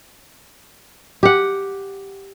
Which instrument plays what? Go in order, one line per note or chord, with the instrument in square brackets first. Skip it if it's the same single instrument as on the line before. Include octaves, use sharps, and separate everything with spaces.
[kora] G4 F#5